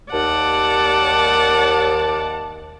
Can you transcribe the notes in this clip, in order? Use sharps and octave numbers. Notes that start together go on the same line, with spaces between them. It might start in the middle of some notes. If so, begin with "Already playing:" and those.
D#2 D5 F#5 A5